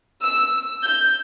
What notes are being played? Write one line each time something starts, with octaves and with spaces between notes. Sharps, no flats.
E6
G6